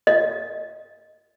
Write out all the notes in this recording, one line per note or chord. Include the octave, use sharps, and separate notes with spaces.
D#5